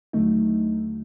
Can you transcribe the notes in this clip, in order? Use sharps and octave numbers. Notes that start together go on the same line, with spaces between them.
D#2 D3 F#3 A3 D#4